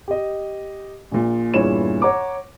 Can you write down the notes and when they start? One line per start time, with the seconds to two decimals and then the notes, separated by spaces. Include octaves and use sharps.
0.08 G4 D#5
1.11 A#1 A#2
1.54 E2 G2 A#2 E4 C#5 E7
2.02 C#5 F#5 A#5 D6